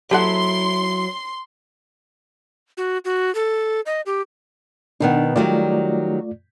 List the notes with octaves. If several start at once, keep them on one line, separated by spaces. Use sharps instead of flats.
F#3 E4 G4 A4 F#5 C6
F#4
F#4
A4
D#5
G4
B2 D#3 B3 D4
D#3 F#3 G3 A3 F4 D5